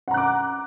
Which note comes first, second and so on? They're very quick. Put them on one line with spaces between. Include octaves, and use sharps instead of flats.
F#5 A#5 F#6 D6